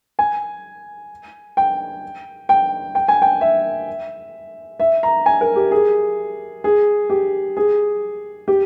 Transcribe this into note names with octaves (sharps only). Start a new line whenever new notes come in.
G#5
G5
G5
G5
G#5
G5
E5
E5
A#5
G#5
A#4
G4
G#4
G#4
G4
G#4
G4